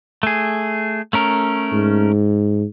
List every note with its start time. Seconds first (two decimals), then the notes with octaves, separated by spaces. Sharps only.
0.23 A3 G#4
1.13 A3 C#4 A#4
1.72 G#2